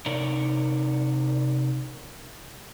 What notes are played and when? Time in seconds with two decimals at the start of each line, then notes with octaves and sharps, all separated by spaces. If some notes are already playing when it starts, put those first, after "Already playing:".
0.06 C3 D#4 A#4 C#5 D5